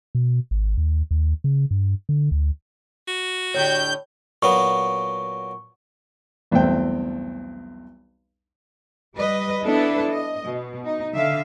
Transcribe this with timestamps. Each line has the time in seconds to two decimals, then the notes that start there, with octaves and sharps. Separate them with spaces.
0.15 B2
0.51 G#1
0.78 D#2
1.11 D#2
1.44 C#3
1.71 G2
2.09 D3
2.32 D2
3.08 F#4
3.54 A2 D3 G4 C#5 G6
4.42 A#2 F#3 B3 C#6
6.51 B1 E2 G2 A3 C4 G5
9.14 G3 B4 D#5
9.65 B3 D4 E4 A4 B4
10.09 D#5
10.43 B2
10.84 D#4
11.13 D3 E5 F5